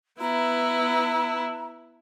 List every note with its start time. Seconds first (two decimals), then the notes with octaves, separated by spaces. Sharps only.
0.21 B3 E4 A#5